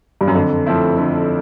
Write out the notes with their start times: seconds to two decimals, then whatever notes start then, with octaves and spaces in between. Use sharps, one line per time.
0.21 G2
0.27 F#2
0.35 F2 D3
0.66 F3 A3 C4 E4
0.97 D3